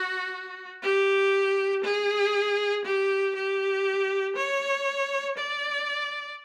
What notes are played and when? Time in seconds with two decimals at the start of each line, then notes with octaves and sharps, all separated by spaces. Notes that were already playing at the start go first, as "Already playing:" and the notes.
Already playing: F#4
0.82 G4
1.84 G#4
2.85 G4
3.35 G4
4.36 C#5
5.37 D5